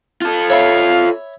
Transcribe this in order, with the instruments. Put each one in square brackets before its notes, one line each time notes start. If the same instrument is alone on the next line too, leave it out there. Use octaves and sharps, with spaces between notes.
[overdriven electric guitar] F4 A4
[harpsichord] C#5 E5 B5 [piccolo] F5